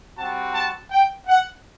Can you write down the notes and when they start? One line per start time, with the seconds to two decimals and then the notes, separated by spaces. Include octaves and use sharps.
0.18 G3 C4 F#4 A5
0.54 A5
0.90 G5
1.26 F#5